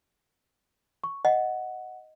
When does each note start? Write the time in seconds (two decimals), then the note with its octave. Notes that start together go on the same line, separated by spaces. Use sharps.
1.04 C#6
1.25 D#5 F#5